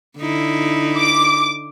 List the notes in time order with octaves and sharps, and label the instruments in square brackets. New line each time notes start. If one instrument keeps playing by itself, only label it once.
[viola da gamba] D3 D#4 E4
[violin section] D6